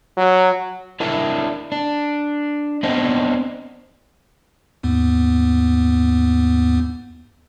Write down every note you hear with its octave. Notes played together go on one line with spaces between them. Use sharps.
F#3
D4 E4 A#4 D5 E5
D4
B3 C4 D4 D#5
D#2 G#2 B3